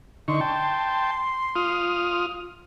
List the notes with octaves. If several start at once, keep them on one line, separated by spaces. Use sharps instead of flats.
D3 D#4 C6 C#6
G5 A5
F4 D#6 F6